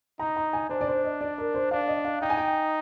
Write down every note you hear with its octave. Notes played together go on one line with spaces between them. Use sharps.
D#4 A#5
A#5
G#5
D4 C5
D5
C5
D#5
D5
A#4
C5
D4 F5
D#5
F5
D#4 G5
G#5
G5